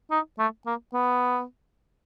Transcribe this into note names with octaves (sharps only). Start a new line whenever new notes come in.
D#4
A3
A#3
B3